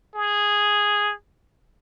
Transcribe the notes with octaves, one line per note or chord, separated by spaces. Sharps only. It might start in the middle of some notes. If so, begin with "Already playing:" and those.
G#4